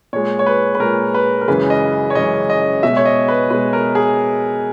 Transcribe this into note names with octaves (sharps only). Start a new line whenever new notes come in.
A#2 G#3 C#5
C#5
B4
B4
A#2 G#3 A#4
B4
A#4
F#2 C#3 E3 G#3 B4
D#5
C#5
F#2 C#3 E3 G#3 D#5
D#5
B2 G#3 E5
C#5
D#5
B4
B2 G#3 B4
A#4
G#4